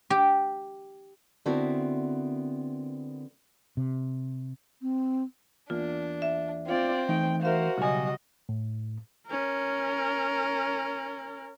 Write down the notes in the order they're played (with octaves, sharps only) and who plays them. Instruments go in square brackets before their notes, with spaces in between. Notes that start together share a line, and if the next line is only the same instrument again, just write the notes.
[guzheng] G4
[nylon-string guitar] D3 B3 C4 E4 F#4 A#4
[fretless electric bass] C3
[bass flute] C4
[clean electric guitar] E2 A#3 [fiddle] D4 [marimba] F4
[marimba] E5
[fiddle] C4 [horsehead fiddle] F4 D5
[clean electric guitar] E3 A3 D#4 [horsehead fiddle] G5
[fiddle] F#4 [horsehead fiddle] A#4 C5 [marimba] E5 F5
[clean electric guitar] B1 G#5 [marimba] C#3 [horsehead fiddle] G3 D#5
[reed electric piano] A2
[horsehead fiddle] C#4 A#4